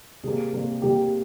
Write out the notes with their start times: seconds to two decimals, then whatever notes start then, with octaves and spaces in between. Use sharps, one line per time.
0.24 C3 G3 A#3 G#4
0.53 C3 G3 A#3
0.82 C3 G3 A#3 G4